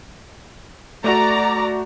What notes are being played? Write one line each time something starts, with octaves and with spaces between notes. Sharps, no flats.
A3 F#4 D5 A#5